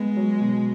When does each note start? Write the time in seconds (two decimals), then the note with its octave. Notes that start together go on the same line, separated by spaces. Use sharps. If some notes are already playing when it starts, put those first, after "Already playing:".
Already playing: G#3 B3
0.16 F#3
0.41 B2